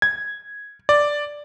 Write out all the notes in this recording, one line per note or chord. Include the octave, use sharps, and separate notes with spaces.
G#6
D5